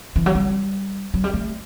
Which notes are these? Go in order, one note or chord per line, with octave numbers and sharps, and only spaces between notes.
E3
F#3
G3
F#3
G3
A3